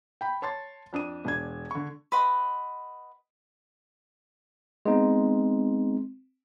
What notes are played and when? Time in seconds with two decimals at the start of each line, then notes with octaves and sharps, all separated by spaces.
0.21 G5 B5
0.42 C#5 A5 C6 A6
0.93 F2 D4 D#6 D#7
1.25 E1 D4 G#6
1.71 D3 C#6
2.12 B4 D#5 F#5 C6
4.86 G#3 B3 C4 D#4